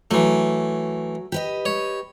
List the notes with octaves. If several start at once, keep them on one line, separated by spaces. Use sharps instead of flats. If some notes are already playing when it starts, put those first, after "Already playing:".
E3 F#3 A3
G4 B4 D#5
C#5